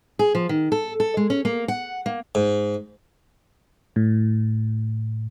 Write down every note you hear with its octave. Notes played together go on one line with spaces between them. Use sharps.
G#4
F3
D#3
A4
A4
G#3
C#4
A#3
F#5
A#3
G#2
A2